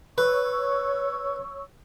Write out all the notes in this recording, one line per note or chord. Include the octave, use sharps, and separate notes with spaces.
B4 C#5 C#6 E6